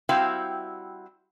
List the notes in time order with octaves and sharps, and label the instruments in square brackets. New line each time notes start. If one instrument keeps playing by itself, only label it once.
[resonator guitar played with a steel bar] G3 C4 E4 F#4 F5 G5